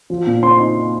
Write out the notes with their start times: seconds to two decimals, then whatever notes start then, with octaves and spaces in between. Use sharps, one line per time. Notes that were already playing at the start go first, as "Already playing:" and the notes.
0.10 F3
0.27 A#2
0.43 C4 C6
0.59 D#4